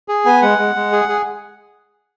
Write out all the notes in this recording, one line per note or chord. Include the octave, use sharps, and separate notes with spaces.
G#4
B3 G#5
G#3 F#5
G#3
G#3
G#4
G#4